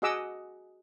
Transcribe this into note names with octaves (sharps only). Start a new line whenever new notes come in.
F#4 G#4 D#5 F#5 D6 E6